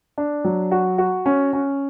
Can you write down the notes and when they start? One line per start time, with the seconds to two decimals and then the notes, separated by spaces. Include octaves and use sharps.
0.18 D4
0.45 F#3
0.71 F#4
0.98 F#4
1.26 C#4
1.53 C#4